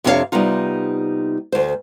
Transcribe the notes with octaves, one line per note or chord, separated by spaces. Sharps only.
F2 C3 D4 D#4 C#5 F5
C3 G3 B3 D#4 F4
D2 C5